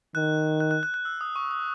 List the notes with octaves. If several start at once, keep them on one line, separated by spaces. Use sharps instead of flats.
D#3 F#6
F#6
F#6
F#6
F#6
E6
D#6
C#6
D#6